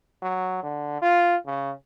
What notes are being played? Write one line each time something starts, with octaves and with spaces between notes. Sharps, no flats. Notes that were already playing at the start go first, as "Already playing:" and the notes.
F#3
D3
F4
C#3